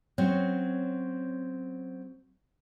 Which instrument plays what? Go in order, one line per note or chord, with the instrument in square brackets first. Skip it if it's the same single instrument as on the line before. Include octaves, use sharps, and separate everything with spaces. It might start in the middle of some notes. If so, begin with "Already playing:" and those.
[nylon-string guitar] F#3 C4 C#4 C#5